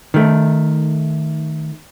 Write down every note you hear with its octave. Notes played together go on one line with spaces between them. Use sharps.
D#3 A3